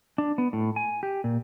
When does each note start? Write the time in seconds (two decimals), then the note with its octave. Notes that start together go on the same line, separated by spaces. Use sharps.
0.18 D4
0.38 B3
0.53 A2
0.76 G#5
1.03 G4
1.24 A#2